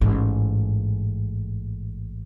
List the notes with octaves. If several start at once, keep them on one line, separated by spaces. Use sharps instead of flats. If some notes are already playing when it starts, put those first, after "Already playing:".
A1 G#2